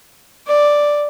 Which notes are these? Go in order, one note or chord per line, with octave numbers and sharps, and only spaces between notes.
D5